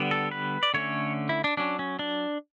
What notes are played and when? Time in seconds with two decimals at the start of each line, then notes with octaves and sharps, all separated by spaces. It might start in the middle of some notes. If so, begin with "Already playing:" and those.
Already playing: D3 G3 B3
0.11 A4
0.31 B4
0.63 D5
0.74 D3 A3 C#4 C#5
1.29 E4
1.44 D4
1.57 F#3 C#4 D4
1.79 C#4
1.99 D4